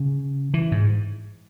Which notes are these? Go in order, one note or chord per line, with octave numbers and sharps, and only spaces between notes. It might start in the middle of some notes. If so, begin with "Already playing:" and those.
Already playing: C#3
E3
G#2